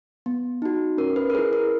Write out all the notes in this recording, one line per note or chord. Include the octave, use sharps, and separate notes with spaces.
B3
D#4 F#4
C#4 A#4
B4
A#4
E4 G#4 B4
A#4